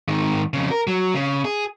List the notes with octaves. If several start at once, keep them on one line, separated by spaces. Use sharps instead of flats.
G#2 D#3
F2 C#3
A#4
F#3
C#3
G#4